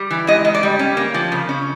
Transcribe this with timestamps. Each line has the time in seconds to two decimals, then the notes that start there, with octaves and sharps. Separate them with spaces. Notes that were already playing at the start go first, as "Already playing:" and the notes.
Already playing: G3
0.11 E3
0.27 G#2 D#5
0.45 G#2
0.54 D5
0.63 G3
0.79 C#4
0.97 A#3
1.14 F3
1.32 C#3
1.49 C#4